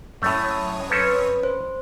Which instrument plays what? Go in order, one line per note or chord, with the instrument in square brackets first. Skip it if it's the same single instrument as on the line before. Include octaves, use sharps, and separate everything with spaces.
[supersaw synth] F#2 C#5 D#6 [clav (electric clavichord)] A2 A3
[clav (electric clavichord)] C4 C#4 A4 [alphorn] B4
[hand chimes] C5